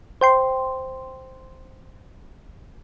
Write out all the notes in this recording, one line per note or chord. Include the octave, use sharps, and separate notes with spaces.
C5 G5 C6